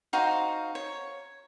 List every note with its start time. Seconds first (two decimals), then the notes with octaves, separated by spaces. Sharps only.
0.13 D#4 F#4 C5 F5
0.75 C#5